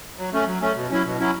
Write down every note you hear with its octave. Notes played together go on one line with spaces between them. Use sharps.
F#3
A3 C#4
F#3
A3 C#4
B2
F#3 C#4 E4
B2
F#3 C#4 E4